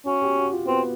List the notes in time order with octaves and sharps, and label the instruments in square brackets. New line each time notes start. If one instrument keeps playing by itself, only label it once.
[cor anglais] C#4 [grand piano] F#4
[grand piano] G4
F#4
F4
[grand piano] B3 [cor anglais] C4